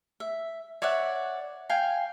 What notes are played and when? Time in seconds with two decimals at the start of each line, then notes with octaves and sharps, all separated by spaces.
0.20 E5
0.82 C#5 D5 E5 F#5
1.69 F5 G5 G#5